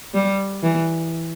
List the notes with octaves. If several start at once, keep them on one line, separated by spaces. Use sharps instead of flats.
G3
E3